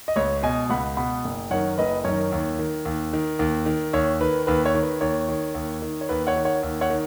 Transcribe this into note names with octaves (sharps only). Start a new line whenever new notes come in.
D#5
C#2 C#5
B2 D#5 G#5
C#2 F#5 B5
B2 F#5 B5
F#1
F#2 D#3 C#5 F#5
F#1 B4 D#5
F#2 D#3 C#5
D#2
D#3
D#2
D#3
D#2
D#3
D#2 C#5
D#3 B4
D#2 B4
C#5
D#3
B4
D#2 C#5
D#3
D#2
D#3
C#5
D#2 B4
C#5 F#5
D#3
C#5 F#5
D#2
C#5 F#5
D#3